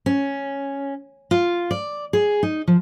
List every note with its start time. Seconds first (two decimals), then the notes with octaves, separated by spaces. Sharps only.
0.06 C#4
1.31 F4
1.71 D5
2.13 G#4
2.43 D#4
2.68 F3